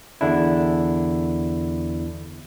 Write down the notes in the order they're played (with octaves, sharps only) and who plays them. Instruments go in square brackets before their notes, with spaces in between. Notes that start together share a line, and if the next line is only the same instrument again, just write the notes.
[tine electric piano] E2 D3 D4 E4